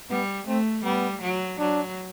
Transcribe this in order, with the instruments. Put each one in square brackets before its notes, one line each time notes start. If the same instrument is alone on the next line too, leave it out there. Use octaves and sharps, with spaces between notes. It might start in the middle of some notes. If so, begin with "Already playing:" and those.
[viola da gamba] G3 [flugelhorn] B3
[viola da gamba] A3 [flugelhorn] C4
[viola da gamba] G3 [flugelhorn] B3
[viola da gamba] F#3
[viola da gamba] F#3 [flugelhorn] D4